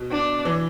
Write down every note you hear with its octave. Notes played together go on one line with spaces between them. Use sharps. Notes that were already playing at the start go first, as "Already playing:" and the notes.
Already playing: B2
D4
E3